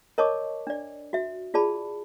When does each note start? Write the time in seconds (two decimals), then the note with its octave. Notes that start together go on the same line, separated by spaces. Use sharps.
0.18 A#4 C#5 D#5 A5 C#6 D6
0.67 D4 D5
1.13 F#4 E5
1.54 F4 G#4 D5 A5 B5